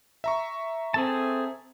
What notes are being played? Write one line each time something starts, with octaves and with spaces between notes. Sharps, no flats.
E5 A#5 C#6
C4 G#4 A4 A5